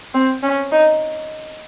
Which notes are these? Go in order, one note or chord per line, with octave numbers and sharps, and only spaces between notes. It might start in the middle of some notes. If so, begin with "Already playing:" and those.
C4
C#4
D#4